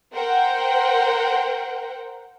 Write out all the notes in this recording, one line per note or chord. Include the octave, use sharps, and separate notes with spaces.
A#4 C5 F#5 G5